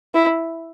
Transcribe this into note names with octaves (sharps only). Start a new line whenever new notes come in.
E4